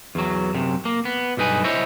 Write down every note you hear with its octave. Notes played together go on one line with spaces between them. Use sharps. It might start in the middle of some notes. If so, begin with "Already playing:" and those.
E2 F#3
F#2 C3
A#3
B3
B1 G2 D#4 B4 G#5
E4 C5 C#5 D#5 E5